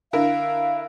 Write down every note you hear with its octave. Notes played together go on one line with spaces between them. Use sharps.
D3 E4 A#4 F5